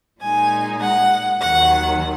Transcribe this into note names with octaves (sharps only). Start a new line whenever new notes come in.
A#2 G#3 D#4 G#5
F#5
D#2 D#3 F#3 F#5